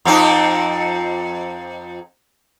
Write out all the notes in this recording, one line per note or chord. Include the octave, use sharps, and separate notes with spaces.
F2 C4 D#4